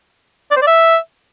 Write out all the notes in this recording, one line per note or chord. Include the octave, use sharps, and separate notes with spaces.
D5
C5
D5
E5